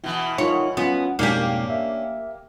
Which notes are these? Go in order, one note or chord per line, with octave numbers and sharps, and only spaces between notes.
B2 E3 E4
D#4 F4 A#4 C#5
B3 C#4 F4
F2 G#2 B2 A#3 C#4 D4 G4 D5
E5